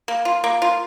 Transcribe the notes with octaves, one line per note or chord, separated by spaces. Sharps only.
A#3
F4
A#3
F4